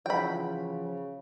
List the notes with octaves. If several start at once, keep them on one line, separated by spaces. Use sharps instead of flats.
C#3 E3 F3 F#4 G5 B5